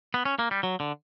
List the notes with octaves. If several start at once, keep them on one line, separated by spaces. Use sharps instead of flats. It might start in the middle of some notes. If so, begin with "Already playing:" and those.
B3
C#4
A#3
G3
F#3
D3